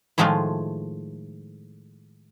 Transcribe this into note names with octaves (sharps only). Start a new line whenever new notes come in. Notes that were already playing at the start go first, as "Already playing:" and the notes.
A2 D#3 F3 G#3 A3 F4